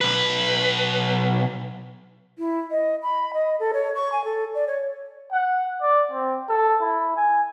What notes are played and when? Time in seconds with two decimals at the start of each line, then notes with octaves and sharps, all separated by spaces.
0.01 B1 B4
2.39 E4
2.71 D#5
3.03 B5
3.34 D#5
3.60 A4
3.74 C#5
3.95 C#6
4.12 G#5
4.25 A4
4.55 D5
4.67 C#5
5.32 F#5
5.81 D5
6.11 C4
6.49 A4
6.81 E4
7.16 G#5